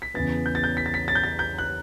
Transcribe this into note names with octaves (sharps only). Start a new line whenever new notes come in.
B6
E2 C#3 E3 B3 A6
G6
A6
G6
B6
A6
B6
A6
G6
A6
G6
F#6